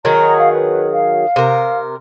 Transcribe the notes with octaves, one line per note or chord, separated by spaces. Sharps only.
D#3 F#3 G#4 A#5
F5
B4
F5
C3 A#4